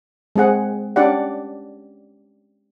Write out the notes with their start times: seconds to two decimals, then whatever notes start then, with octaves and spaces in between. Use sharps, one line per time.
0.36 G#3 C4 G#4 F#5
0.96 C#4 D4 G4 D5 F#5